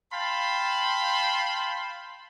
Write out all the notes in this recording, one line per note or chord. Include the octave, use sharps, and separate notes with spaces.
F5 G5 A5 B5 C6